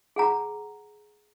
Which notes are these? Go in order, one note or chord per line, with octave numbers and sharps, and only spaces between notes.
G#4 F#5 A#5